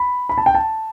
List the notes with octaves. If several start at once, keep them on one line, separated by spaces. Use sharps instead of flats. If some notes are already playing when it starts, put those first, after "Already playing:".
Already playing: B5
B5
A5
G5
A5